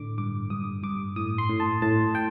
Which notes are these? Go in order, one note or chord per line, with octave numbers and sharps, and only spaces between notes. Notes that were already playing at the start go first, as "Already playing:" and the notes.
Already playing: A2 D3 D6
G2 D6
G2 D#6
G2 D6
A2 D#6
C6
A2
A5
A2 A5
A2 G5